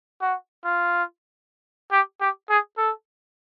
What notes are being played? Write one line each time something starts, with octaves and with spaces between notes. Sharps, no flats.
F#4
F4
G4
G4
G#4
A4